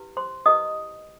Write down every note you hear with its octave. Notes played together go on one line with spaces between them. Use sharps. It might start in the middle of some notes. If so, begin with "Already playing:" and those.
Already playing: E4 G4 B4
C5 C6
E4 G4 B4 D#5 D#6